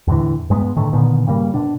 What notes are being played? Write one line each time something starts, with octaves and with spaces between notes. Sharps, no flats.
E2 A2 D3 E3
G2 G#3 A3 B3
A2 D3 D#3 A3
A#2 D3 D#3 B3
G2 C#3 G3 A#3
B2 D4